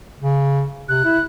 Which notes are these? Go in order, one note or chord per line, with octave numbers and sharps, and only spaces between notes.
C#3
C3 F#6
E4